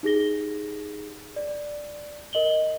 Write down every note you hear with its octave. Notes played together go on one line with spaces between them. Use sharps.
D#4 G4 G#4 A#6 G7
D5
A#4 D#5 F#7 G7